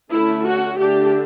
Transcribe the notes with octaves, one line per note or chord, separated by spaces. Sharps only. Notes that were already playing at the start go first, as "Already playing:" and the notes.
D3 A3 C#4 E4
F#4
D3 A3 D4 G4